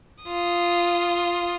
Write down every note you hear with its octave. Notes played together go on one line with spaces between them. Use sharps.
F4 D#6